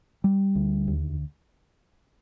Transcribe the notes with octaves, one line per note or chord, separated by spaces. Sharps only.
G3
D2
D#2